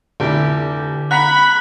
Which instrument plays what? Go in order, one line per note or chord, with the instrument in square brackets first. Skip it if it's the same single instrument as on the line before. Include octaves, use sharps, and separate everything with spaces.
[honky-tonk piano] F1 E4 [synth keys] D3 G4
[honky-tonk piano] F#5 A#5 B6 [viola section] B5 [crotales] F#6